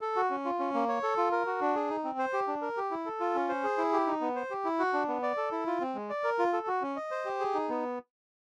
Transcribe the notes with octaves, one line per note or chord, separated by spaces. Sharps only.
A4
F#4
C#4
F4
C#4
A#3
C#5
A4
F4
A#4
F#4
D4
G#4
D#4
C4
C5
G4
D4
A#4
G4
E4
A4
F4
C#4
C5
G#4
E4
G4
D#4
B3
C5
G4
E4
F#4
D4
B3
D5
A4
E4
F4
C4
G#3
D5
A#4
F4
A4
F#4
C#4
D#5
C5
G4
G#4
D#4
B3